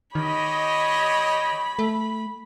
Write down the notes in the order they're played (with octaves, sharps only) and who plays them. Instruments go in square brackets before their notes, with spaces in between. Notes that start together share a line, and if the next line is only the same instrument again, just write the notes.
[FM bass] D#3 [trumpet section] G4 C#5 D#5 [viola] B5
[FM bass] A3